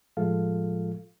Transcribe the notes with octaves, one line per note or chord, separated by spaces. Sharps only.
A2 F3 G#3 F4 A4 F5